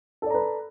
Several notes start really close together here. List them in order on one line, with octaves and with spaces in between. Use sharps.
A4 D5 A#5 B4